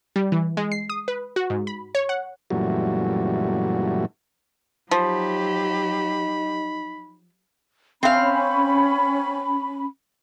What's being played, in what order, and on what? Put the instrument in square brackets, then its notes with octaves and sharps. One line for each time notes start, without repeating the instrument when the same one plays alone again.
[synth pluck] G3
E3
G#3
C7
D#6
B4
F#4
G#2
B5
C#5
F#5
[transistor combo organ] F#2 A#2 E3 G3 A3 F#4
[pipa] F3 [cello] F#3 G4 [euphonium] D#4 [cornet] B5
[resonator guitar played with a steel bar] C4 F5 [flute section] C#4 B5